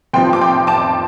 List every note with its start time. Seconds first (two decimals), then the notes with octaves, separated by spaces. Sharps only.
0.14 F1 F2 F3 C4 G5 C6
0.33 D6
0.41 G5 C6
0.67 A5 D6